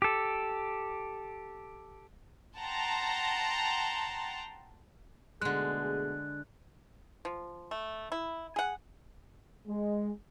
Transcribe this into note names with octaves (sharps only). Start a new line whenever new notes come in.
G4 A4
F#5 G5 A5 A#5 C6
B2 D3 G#3 A3 G#4 F#6
F3
A3
E4
G#4 F#5
G#3